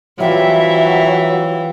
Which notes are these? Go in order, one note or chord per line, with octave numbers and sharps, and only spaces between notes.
E3 F#3 G3 C4 F4 E5